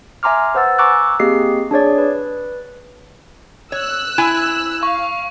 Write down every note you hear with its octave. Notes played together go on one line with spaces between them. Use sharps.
E5 G#5 A#5 C6 D6 F6
B4 C5 F#5 E6 A6
G#5 A#5 C#6 D6 E6 F#6
A#3 C4 G4 G#4 D#5 C7
D4 G#4 C#5 D5
B4
C#5 E6 F#6
E4 G#5
F5 C#6